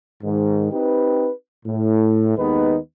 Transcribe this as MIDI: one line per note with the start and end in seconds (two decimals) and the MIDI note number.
0.23 0.69 44
0.23 0.69 51
0.71 1.29 60
0.71 1.29 63
0.71 1.29 67
0.71 1.29 71
1.65 2.32 45
2.36 2.76 39
2.36 2.76 51
2.36 2.76 56
2.36 2.76 59
2.36 2.76 63
2.36 2.76 71